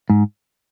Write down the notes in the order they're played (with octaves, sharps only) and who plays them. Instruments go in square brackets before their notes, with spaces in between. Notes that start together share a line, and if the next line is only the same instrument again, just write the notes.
[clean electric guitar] G#2